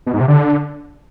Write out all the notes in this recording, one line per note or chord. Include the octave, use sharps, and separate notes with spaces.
B2
G#2
C3
D3